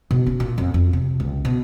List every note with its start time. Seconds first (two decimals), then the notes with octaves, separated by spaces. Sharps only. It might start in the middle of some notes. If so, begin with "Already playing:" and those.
0.11 B2
0.26 C#4
0.40 A#2
0.58 F2
0.74 F2
0.93 C3
1.20 C#2
1.45 B2